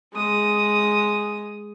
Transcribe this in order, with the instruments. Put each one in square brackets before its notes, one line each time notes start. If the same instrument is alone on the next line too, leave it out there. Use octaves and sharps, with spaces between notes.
[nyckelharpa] G#3 D#6